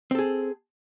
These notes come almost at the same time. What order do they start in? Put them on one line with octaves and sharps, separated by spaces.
C4 A4 G#4